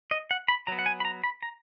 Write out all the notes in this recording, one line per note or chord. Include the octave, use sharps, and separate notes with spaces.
D#5
F#5
B5
F#3 B3 A#5
F#5
G#5
B5
A#5
B5
A#5